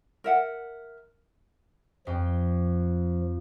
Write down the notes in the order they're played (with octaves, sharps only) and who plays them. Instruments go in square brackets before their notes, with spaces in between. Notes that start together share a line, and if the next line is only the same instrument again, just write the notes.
[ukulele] A#4 E5 F#5
[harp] F2 G5 [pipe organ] F3